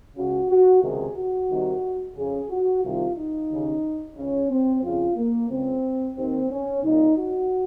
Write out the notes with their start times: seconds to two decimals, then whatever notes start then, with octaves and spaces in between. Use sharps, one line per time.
0.16 C#2 C#3 F#4
0.49 F#4
0.82 C#2 C3 D#3 G#4
1.16 F#4
1.50 C2 C3 D#3
2.15 F2 C#3 G#4
2.49 F#4
2.83 C2 C3 D#3 F4
3.16 D#4
3.50 D#2 C#3
4.16 C#2 C#3 C#4
4.49 C4
4.83 F2 C#3 F4
5.16 A#3
5.49 C#2 C#3 C4
6.16 D#2 D#3 C4
6.50 C#4
6.83 C2 A#2 D#4
7.16 F#4